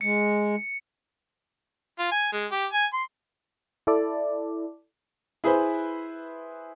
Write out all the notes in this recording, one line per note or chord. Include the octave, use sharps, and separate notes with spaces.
G#3 C#7
F4
G#5
G#3
G4
G#5
C6
E4 A4 D5
E4 G#4 B4 C5 B5